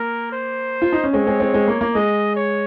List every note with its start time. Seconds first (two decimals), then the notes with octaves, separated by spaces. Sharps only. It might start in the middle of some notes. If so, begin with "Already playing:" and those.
Already playing: A#3 A#4
0.32 C5
0.82 F4
0.92 D#4
1.04 C#4
1.13 G#3 C4 C#5
1.27 G#3 C4
1.40 G#3 C4
1.54 G#3 C4
1.68 A#3
1.81 A#3
1.94 G#3 D#5
2.36 C#5